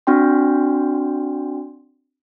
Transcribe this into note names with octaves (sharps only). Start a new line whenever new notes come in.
C4 D4 F#4 G5 C6